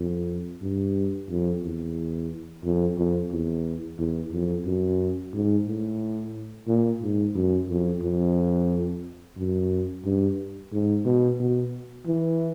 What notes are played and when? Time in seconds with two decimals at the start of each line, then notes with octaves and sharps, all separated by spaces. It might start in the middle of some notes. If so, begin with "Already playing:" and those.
Already playing: F2
0.61 G2
1.29 F2
1.63 E2
2.64 F2
2.97 F2
3.31 E2
3.98 E2
4.32 F2
4.66 F#2
5.33 G#2
5.67 A2
6.68 A#2
7.02 G#2
7.35 F#2
7.69 F2
8.02 F2
9.37 F#2
10.05 G2
10.72 G#2
11.05 B2
11.39 B2
12.06 E3